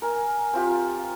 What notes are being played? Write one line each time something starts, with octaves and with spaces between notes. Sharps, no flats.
A#4 G#5
C4 F4 G4